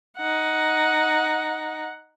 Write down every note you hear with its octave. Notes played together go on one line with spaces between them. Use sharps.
D#4 F#5